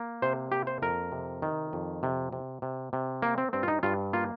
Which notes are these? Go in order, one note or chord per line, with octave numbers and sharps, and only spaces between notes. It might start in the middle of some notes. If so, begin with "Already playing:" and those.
Already playing: A#3
C3 C5
A#3 G4
C5
F2 A#4
C3
D#3
F2
C3
C3
C3
C3
A#3
C4
G2 C4
F4
D#4
G2 F4
A#3 F4